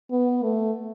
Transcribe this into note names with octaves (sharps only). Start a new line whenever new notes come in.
B3
A3